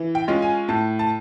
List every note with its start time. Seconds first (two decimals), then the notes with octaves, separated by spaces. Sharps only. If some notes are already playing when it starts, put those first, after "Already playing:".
Already playing: E3
0.15 G5
0.28 G#3 C#4 F4
0.42 G#5
0.69 A2 A5
0.99 A5